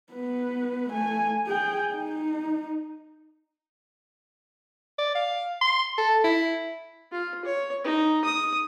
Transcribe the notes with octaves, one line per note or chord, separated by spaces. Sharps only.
B3 B4
A3 G#5
G#4 G5
D#4
D5
F5
C6
A4
E4
F4
C#5
D#4
D#6